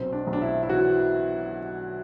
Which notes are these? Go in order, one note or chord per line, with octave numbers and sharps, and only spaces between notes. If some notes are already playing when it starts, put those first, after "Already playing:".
Already playing: B1 C4
D4
B1
D4
E4
E4
E3 F#4